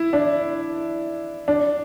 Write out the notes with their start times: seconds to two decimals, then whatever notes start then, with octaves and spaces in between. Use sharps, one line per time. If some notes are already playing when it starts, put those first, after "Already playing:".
Already playing: E4
0.13 D4
1.48 D4